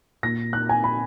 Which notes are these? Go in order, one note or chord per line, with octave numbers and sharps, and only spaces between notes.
A#2 A#6
F#6
G#5
B5